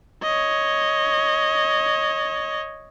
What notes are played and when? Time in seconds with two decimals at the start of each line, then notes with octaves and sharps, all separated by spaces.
0.23 C#5 D#5